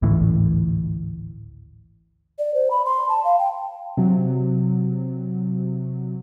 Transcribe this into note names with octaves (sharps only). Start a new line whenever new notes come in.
G#1 D2 A2 E3
D5
C5
B5
C6
A5
F5
G5
C3 F#3